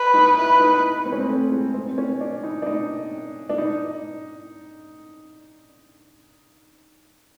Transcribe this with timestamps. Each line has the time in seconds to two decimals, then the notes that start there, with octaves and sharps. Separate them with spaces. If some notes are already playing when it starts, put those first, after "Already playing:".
Already playing: B4
0.14 D#4
0.37 E4 B4
0.60 D#4
1.05 C4
1.12 C#4
1.20 C4
1.28 A3
1.51 G#3
1.74 C4
1.98 C#4
2.21 D4
2.44 D#4
2.62 D4
2.66 D#4
3.49 D4
3.58 D#4